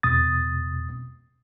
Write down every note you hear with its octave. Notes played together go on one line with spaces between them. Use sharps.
E2 B2 D#6 A6